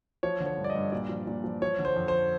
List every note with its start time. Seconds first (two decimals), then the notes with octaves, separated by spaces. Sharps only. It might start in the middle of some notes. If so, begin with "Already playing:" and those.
0.23 F3 C#5
0.40 D3
0.46 C#5
0.57 G2
0.64 D5
0.70 D#5
0.75 G2
0.92 A#2 D5
1.09 F3
1.27 A#2
1.44 F3
1.62 F3 C#5
1.79 D3
1.85 C5
1.96 F2
2.08 C5